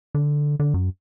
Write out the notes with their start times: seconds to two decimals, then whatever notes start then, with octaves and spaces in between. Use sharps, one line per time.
0.15 D3
0.60 D3
0.74 F#2